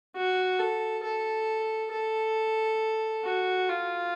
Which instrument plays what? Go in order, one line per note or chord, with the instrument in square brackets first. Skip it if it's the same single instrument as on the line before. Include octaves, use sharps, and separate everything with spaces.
[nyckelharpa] F#4
A4
A4
A4
F#4
F4